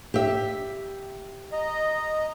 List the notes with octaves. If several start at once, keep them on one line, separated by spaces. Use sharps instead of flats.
G4 E5
D#5 A#5